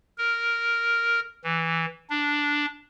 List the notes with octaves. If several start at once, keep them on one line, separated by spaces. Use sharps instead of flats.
A#4
E3
D4